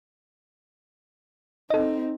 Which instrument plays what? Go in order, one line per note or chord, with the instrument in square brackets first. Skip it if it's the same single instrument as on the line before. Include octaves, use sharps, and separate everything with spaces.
[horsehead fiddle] C4 D#4 [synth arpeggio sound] A4 D#5